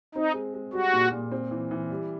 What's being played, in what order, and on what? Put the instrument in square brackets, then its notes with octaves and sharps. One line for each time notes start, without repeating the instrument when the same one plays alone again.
[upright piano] C4 [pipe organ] D#4
[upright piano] G#3
G#3
[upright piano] G3 [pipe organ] F#4
[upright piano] A#2
A#2
C4
E3
E3
G3